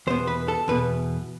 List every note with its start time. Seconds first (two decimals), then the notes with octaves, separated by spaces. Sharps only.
0.07 E2 B2 B3 C5
0.27 B4
0.48 A4
0.68 E2 B2 B3 B4